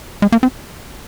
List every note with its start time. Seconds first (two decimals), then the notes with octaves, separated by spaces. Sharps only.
0.22 G#3
0.32 A#3
0.43 C4